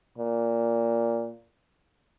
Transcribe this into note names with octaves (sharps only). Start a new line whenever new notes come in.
A#2